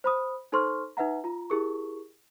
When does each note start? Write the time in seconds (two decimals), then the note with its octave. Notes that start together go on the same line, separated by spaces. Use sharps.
0.04 C5 B5 D#6
0.52 D#4 A4 C5 C6 C#6 F6
0.97 D#4 B4 E5 F#5 A#5
1.24 F4 A#5
1.50 E4 G4 G#4 A#4 C#6